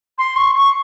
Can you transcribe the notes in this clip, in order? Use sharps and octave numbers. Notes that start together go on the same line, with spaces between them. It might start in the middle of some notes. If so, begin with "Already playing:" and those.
C6
C#6
C#6